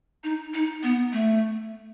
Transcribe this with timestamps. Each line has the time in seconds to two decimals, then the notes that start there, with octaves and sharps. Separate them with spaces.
0.24 D#4
0.54 D#4
0.83 B3
1.12 A3